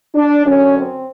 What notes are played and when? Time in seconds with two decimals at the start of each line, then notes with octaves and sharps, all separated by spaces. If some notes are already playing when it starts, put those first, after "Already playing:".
0.15 D4
0.45 F#2 D3 C#4
0.75 C4